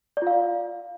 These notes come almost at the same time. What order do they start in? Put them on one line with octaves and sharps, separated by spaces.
D5 F4 F5